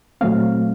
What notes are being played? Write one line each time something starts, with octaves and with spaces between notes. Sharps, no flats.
A#2 F#3 A3 C4 F5